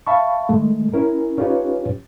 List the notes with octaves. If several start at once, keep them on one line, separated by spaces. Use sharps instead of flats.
E5 F5 A5 B5 C#6
D#3 G#3 A3
C#4 E4 A#4
C#4 D#4 F4 G4 B4 C#5